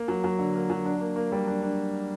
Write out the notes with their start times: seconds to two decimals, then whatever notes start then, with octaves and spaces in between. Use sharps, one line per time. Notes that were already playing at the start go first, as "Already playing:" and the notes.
Already playing: A#3
0.08 F#3
0.24 F#3
0.39 D3
0.55 A#3
0.70 F#3
0.85 D4
1.00 A#3
1.16 A#3
1.32 G3
1.47 D4
1.62 D4